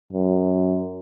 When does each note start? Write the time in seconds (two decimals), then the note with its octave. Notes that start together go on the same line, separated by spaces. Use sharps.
0.13 F#2